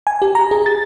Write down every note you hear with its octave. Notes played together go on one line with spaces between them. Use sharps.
G#5
G4
A#5
G#4
A6